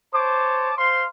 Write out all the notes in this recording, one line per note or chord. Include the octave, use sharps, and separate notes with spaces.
C5 C#5 A5 D6
C5 F5 C6